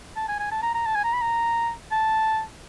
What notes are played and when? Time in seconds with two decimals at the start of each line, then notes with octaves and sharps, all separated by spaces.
0.16 A5
0.28 G#5
0.39 G#5
0.51 A5
0.62 A#5
0.74 A#5
0.86 A5
0.95 G#5
1.04 A#5
1.13 B5
1.21 A#5
1.91 A5